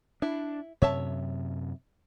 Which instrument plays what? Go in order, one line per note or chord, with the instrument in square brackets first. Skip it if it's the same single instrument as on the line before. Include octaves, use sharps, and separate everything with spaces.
[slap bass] D4 [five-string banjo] E4
[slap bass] F#2 C3 [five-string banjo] C#5 E5 A5